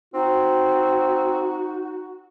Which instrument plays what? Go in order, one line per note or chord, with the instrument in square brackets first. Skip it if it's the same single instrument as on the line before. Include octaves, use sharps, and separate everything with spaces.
[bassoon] C4 [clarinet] D#4 [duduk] F#4